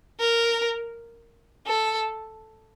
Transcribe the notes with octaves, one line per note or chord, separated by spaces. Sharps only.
A#4
A4